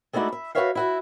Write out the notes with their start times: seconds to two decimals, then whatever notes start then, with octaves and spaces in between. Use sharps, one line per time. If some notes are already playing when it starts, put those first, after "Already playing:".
0.13 G#3 A3 D#4 E4 F#4 D5
0.32 E5
0.55 F#4 G#4 B4 C#5 E5 F5
0.75 E4 F#4 E5